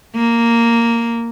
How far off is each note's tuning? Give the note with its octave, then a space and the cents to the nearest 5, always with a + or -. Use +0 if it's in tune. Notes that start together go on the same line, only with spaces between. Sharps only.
A#3 -5